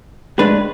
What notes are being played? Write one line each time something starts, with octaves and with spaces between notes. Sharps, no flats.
A2 G#3 D4 B4